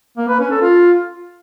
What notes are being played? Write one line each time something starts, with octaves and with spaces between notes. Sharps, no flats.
A#3
B4
C#4
A4
F4